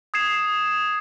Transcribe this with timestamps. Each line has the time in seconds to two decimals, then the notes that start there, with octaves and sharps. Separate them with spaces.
0.14 D#6 G#6 C7 E7